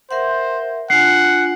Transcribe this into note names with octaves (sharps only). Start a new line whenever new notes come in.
A#4 C5 E5 F#5
D4 F4 F#5 G#5 C7